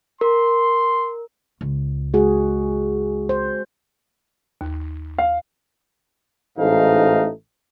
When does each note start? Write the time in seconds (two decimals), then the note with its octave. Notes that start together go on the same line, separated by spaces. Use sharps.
0.21 A#4 C6
1.61 C#2
2.14 G#3 F#4 G#4
3.29 C5
4.61 D#2
5.18 F5
6.58 A1 G#2 A3 D#4 F5